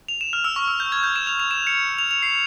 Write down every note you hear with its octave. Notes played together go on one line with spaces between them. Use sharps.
F7
E7
F6
E6
C#6
E6
G6
G#6
G6
E7
F7
F7
E7
C#7
F7
F7
C7